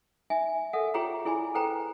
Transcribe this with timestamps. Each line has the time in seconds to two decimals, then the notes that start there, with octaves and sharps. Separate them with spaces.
0.30 D#4 E5 G#5
0.73 A4 A#4 D5 E5 F#5
0.94 F4 G4 G#4 C#5 G5 A#5
1.25 E4 G#4 D5 G#5 B5
1.54 A4 B4 C5 G5 A#5